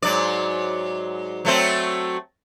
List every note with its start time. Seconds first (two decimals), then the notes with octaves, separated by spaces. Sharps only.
0.02 G#2 F#3 D5
1.45 F#3 A3 C4